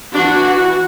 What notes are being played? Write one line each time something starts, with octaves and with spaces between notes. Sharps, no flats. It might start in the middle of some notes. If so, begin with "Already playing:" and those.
E3 D4 F#4